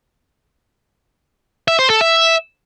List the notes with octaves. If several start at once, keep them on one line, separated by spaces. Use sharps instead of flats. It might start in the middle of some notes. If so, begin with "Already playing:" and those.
E5
C5
A4
E5